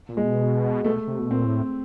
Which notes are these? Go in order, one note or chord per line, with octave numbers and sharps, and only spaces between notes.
A#2
G#3
B2
B2 A3
C3
B2
A#2 C4
A2